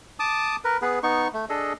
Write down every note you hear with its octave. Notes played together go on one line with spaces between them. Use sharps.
A5 D6 D#6
A#4 B4
B3 G#4 B4
B3 D#4 C#6
A3
D4 G#4 A4 D#5